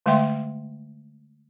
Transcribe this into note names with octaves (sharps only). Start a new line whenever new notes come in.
D3 G#3 A3 E5 G5 C6